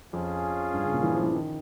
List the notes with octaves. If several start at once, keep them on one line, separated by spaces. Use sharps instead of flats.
F2 C#4 F4 G#4
G2
C#3
A#2
E3
F3
E3
D#3